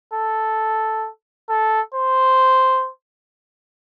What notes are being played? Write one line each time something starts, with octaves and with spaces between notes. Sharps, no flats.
A4
A4
C5